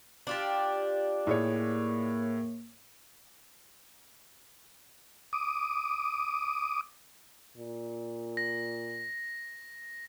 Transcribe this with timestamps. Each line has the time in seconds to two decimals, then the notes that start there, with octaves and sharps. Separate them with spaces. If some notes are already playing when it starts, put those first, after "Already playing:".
0.27 D4 F4 G4
1.27 A2 A#3 G#4 C#5
5.33 D6 D#6
7.57 A#2
8.37 A#6